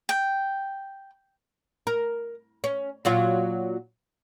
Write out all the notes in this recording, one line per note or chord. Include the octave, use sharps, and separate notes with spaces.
G5
A#4
C#4
A#2 F#3 F4